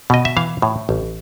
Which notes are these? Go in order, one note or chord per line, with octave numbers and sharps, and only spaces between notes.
B2 D#5
E5
E3 F5
A2
A1